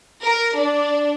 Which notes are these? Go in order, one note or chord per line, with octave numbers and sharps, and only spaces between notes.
A#4
D4